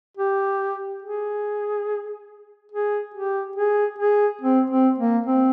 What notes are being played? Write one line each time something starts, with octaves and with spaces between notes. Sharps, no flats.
G4
G#4
G#4
G4
G#4
G#4
C4
C4
A#3
C4